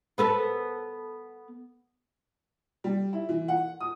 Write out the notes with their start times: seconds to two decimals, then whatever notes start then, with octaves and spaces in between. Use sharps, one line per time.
0.18 B3 A4 B4
2.84 G3
3.13 E4
3.29 E3
3.48 F#5
3.81 D#6